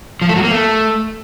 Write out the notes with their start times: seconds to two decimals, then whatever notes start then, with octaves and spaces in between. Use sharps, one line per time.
0.22 F3
0.29 A3
0.36 F#3
0.44 A#3
0.51 A3